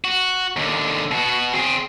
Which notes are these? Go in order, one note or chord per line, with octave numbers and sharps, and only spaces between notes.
F#4
D#2 D3
B2 F#4
C4 G#4